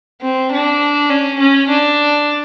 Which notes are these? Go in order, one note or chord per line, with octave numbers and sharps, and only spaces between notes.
C4
D4
C#4
C#4
D4